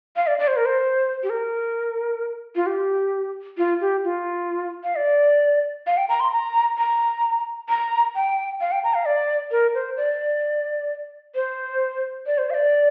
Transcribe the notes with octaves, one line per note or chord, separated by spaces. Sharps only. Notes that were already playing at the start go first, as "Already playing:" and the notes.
F5
D5
D5
C5
A#4
C5
G4
A#4
F4
G4
F4
G4
F4
F5
D5
F5
G5
A#5
C6
A#5
A#5
A#5
G5
F5
G5
A#5
F5
D5
A#4
C5
D5
C5
D5
C5
F5
D5